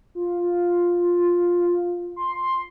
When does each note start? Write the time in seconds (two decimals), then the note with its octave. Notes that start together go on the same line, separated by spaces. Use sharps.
0.15 F4
2.16 C6